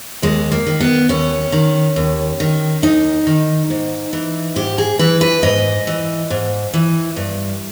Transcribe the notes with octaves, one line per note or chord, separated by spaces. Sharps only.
D#2 G#3
A#3
D#3
B3
D#2 C#4
D#3
D#2
D#3
D#2 D#4
D#3
G#2
E3
G#2 G4
G#4
E3 B4
B4
G#2 D#5
E3
G#2
E3
G2